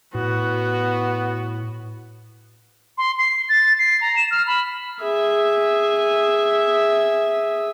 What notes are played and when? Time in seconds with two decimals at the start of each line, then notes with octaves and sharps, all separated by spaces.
0.15 A2 B3 F#4
2.98 C6
3.19 C7
3.49 A6
3.79 C7
4.01 A#5
4.16 E7
4.31 F6
4.47 B5
5.03 G#4 E5